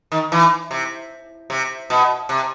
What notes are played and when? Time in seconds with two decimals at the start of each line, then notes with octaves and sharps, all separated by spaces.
0.12 D#3
0.32 E3
0.71 C3
1.50 C3
1.90 B2
2.29 C3